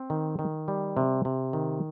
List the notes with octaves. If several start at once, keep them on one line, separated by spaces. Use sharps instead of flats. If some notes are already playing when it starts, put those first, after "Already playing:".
Already playing: C4
D#3
D#3
G3
C3
C3
D#3